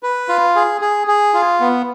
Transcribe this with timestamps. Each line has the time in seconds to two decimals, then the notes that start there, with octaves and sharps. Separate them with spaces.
0.03 B4
0.29 F4
0.56 G#4
0.81 G#4
1.07 G#4
1.34 F4
1.60 B3